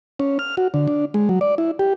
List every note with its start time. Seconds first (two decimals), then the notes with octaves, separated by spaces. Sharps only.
0.19 C#4
0.39 F6
0.57 F#4
0.74 D3
0.88 D4
1.14 G#3
1.29 F#3
1.41 D5
1.58 E4
1.79 G4